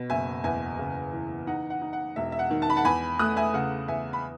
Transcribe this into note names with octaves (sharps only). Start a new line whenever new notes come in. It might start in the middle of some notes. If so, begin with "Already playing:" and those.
Already playing: B2
F#1 E5 G#5
E2 E5 G#5
C#3
E3
D#4 F#5
F#5
D#4
F#5
E1 E5
E5
F#5
D#3
A5
B5
F#5 A5
E2 G#5 B5
A3 D#6 F#6
E5 G#5
C#3 F#5
E2 E5 G#5
B5